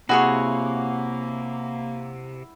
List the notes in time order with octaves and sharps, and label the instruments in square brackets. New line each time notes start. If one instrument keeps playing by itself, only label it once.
[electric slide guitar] C3 [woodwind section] A#3 [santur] E4 F#5 [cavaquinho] F#4 G#4 C#5